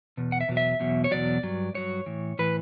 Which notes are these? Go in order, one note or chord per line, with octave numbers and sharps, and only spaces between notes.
E2 B2
F#5
E5
E2 B2 F#3
E5
E2 B2 F#3
C#5
E2 B2 F#3 D5
G2 F#3
G2 F#3 C#5
A2 E3
A2 E3 B4